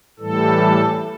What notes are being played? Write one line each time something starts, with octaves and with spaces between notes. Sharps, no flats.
A2 E3 G3 A4